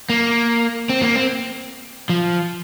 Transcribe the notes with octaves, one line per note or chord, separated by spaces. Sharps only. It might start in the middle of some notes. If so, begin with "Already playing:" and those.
A#3
C4
A#3
C4
F3